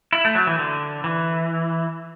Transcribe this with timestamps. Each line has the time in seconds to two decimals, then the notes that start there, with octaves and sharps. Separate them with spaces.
0.13 E4
0.25 A3
0.35 F#3
0.47 E3
0.59 D3
1.04 E3